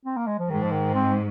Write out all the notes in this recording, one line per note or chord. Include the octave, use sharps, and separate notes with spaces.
C4
A#3
G#3
F3
G#2 D#3
F3
D#3
C4